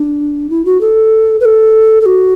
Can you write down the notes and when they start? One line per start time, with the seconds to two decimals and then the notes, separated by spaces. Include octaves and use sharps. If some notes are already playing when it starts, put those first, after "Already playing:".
Already playing: D4
0.50 E4
0.65 F#4
0.81 A4
1.41 B4
1.45 A4
2.01 A4
2.06 F#4